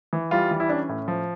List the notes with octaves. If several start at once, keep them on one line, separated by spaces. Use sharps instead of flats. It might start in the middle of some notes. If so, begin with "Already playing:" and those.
E3
G3 F4
E3
E4
C#4 D4
A2
F3